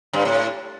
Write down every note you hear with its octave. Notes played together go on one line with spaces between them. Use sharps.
G2
A2